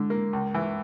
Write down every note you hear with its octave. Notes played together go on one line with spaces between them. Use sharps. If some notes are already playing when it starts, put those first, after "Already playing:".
Already playing: D3 G#3
A#3
C#2
E3